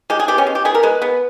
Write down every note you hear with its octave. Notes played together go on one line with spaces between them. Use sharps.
G#3 G4
G#4
B3 G4
C#4
G#3
G4
B3 G#4
A#4
G#3 B4
B3